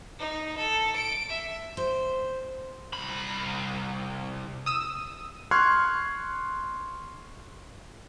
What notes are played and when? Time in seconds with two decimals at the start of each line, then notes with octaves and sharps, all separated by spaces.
0.19 D#4
0.57 A4
0.96 D7
1.30 E5
1.77 C5
2.93 C2 B5
4.66 D#6 E6
5.51 C6 C#6 F6 F#6 G#6 C7